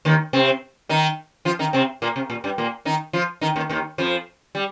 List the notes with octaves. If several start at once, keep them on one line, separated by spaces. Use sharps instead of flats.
D#2 D#3
C3 C4
D#3 D#4
F3 F4
D#3 D#4
C3 C4
A#2 A#3
C3
A#2
G2 G3
A#2 A#3
D#3 D#4
F3 F4
D#3 D#4
D#2 D#3
D#2 D#3
F2 F3
G3